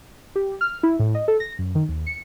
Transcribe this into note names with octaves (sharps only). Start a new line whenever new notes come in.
G4
F6
E4
A2
D#5
A4
A#6
F#2
D#3
D#2
C#7